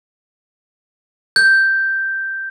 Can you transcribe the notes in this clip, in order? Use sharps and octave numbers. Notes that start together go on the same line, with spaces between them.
G6